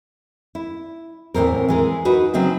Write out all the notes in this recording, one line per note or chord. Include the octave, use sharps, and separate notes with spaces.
E4
E2 A2 C4 A#4
E3 G#3 A#4
D#4 F#4 B4
C#3 F#3 C4 D#4 E5